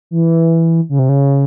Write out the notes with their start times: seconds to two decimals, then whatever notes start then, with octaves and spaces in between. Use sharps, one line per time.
0.11 E3
0.89 C#3
0.99 C3
1.09 C#3